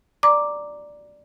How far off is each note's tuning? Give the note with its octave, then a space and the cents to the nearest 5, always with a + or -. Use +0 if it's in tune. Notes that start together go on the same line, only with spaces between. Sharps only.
D5 +0 A#5 +0 D6 +0